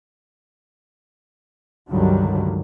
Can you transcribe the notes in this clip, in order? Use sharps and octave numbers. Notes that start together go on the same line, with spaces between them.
C#2 G2 D3 D#3 F#3 G3